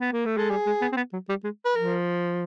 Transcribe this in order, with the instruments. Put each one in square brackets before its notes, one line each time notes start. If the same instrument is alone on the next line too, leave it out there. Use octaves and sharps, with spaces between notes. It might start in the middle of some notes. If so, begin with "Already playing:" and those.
[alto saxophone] B3
A#3
A3
[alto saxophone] G#3 [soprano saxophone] A4
[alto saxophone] G3 [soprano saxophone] G#4
[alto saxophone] G#3
B3
C4
B3
F#3
G3
G#3
[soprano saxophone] B4
[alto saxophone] F3 [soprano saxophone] A#4